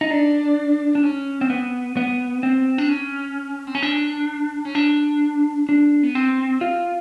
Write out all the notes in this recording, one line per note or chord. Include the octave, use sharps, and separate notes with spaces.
D#4
D4
D4
C#4
C4
B3
B3
C4
D4
C#4
C4
C#4
D4
C#4
D4
D4
B3
C4
F4